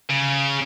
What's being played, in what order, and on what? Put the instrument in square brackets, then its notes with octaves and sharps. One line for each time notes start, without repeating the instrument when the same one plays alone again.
[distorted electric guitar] C#3